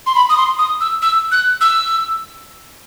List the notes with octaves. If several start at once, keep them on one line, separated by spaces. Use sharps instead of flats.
C6
B5
D#6
C6
D#6
E6
E6
F#6
E6